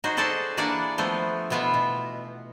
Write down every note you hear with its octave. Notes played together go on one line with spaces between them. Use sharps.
D#4 F#4 G#4 C5
G#4 A4 C5 D5 F#5 A5
E3 A#3 D4 D5 F#5 G#5
F3 A3 B3 C5
B2 E3 B3 F4 E5
B2